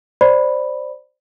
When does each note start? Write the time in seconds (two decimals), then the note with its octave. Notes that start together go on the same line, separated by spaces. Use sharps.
0.21 C5 D5 B5